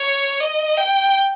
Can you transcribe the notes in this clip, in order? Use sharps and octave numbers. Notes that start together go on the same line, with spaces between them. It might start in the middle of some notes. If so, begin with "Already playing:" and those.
Already playing: C#5
D#5
G5